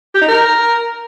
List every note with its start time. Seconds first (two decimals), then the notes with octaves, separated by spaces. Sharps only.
0.15 G4
0.21 D#4
0.28 A#4